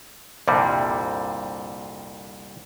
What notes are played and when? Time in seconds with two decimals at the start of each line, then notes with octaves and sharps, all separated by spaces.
0.48 C2 F2 A#2 D3 G3